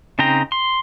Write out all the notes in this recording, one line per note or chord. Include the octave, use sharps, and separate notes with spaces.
C#3 C4 D#4 G5 A#5
C6